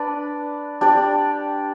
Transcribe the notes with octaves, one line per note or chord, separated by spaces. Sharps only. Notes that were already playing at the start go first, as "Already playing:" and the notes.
Already playing: D4 B4 D5
D4 G4 D5